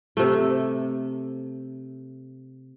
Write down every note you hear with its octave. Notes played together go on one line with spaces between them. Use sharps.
C3 A3